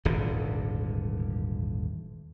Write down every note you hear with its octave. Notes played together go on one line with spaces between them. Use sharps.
D#1 G#1 E2 D3